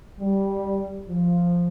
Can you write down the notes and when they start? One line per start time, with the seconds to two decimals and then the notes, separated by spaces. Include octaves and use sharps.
0.19 G3
1.08 F3